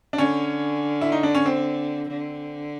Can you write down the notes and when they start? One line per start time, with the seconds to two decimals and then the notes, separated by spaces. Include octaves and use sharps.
0.13 D4
0.18 D3 C#4
1.01 E4
1.12 D#4
1.23 D4
1.35 C#4
1.46 C4
2.09 D3